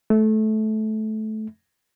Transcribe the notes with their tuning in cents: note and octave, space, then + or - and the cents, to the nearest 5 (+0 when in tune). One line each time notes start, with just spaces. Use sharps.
A3 -20